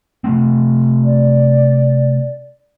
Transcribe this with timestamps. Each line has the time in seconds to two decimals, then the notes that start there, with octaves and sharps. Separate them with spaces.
0.24 C3 A3 C4
1.04 D5